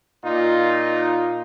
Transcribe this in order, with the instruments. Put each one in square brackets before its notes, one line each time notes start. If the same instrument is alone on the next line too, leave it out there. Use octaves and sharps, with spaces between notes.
[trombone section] A#2 D#4 F4